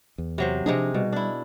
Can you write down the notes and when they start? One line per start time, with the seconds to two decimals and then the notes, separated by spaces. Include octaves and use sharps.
0.18 E2
0.38 C3 F#3 C5
0.66 C3 F3 D4 D#4 G#4
0.94 B2 G3
1.13 D4 E4